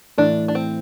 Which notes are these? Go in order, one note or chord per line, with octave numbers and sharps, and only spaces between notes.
A2 E3 A3 D4 E4
D4
C4